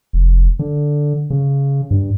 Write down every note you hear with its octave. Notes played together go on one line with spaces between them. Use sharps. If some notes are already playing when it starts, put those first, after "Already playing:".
F1
D3
C#3
G2